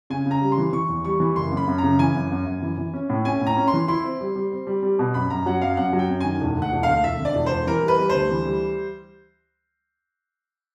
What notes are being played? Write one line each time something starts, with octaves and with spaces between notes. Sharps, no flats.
C#3 G#5
C#3 A#5
G3
C6
E3
E3 C#6
E2
G3 C#6
E3
F#1 C6
F#2
B5
F#2
A#5
C#3
E3 G#5
F#2
F#2
F#2
E3
E3
C#4
A2
C#4 G#5
A2
A#5
C#4
C6
E3
E4 C6
C4
G3
G3
C4
G3
G3
B2
F#2 B5
F#2 A#5
F#3 F#5
F#2 F5
F#2 F#5
F#3
G5
F#2
D#3 G#5
E1
D2
F#5
E1
D2 F5
E1 E5
D3
D5
E1
E1 C5
E3 A#4
G3
B4
G3
D2 C5
E3
G3